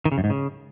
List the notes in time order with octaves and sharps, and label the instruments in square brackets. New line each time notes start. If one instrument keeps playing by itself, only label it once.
[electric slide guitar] D#3
C#3
F#2
G#2
C#3